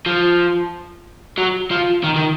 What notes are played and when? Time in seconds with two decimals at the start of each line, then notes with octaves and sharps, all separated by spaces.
0.06 F3
1.38 F#3
1.71 F3
2.04 D#3
2.16 D#3